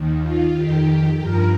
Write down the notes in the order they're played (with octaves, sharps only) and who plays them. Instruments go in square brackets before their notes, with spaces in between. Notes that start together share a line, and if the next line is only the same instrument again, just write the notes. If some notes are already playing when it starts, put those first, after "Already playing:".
Already playing: [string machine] D#2 D#3
F4
F2 D#3 G4
G2 F3 A#4